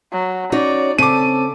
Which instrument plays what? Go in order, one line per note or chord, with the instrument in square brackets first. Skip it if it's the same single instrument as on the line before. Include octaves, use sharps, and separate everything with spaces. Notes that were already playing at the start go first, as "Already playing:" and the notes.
[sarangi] F#3
[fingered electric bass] C#4 [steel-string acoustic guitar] D#4 F#4 C#5 [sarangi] D5
[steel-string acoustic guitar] C#3 [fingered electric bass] C4 [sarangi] A4 [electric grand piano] D6 D#7